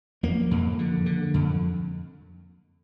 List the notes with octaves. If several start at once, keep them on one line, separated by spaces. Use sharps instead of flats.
F2 A#3
F2
D3
D3
F2